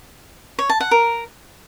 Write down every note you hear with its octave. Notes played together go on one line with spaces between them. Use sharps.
C#5
A5
F#5
A#4